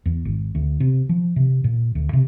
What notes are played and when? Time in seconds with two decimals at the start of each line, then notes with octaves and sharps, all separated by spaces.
0.06 E2
0.25 G#1
0.55 D2
0.80 C3
1.09 F3
1.36 C3
1.64 A#2
1.95 D2
2.13 C3